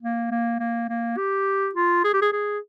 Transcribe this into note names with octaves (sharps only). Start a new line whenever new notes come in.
A#3
A#3
A#3
A#3
G4
F4
G#4
G4
G#4
G#4